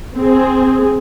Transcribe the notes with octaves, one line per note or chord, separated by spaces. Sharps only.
C4 G#4